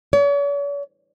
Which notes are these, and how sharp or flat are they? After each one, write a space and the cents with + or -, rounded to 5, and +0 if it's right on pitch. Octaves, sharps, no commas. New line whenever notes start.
C#5 +45